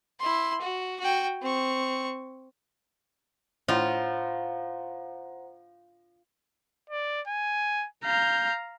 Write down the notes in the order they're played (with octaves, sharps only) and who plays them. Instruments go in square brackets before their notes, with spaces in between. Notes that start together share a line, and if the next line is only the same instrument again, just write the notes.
[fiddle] E4 C6
F#4
F#4 G5
C4 C#6
[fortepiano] A2 [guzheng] F4 [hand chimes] C5 F#5 A#5
[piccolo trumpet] D5
G#5
[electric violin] F5 A#5 [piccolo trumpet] G6